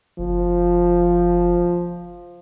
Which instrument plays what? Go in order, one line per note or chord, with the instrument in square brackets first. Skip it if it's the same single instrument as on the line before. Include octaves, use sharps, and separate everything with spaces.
[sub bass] F#1 [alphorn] F3